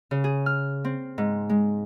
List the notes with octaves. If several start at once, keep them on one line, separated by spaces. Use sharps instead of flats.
C#3
G#4
F6
C4
G#2
G#3